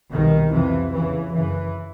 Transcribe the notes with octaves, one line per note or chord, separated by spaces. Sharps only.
C2 B2 D#3
F2 C3 E3
E2 C#3 E3
F#2 C#3 E3